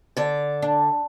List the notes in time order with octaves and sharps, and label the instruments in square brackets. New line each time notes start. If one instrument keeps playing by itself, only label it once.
[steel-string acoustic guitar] D3 D5
[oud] D4